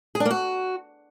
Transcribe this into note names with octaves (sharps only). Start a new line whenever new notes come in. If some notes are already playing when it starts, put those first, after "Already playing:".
G#4
D4
A#3
F#4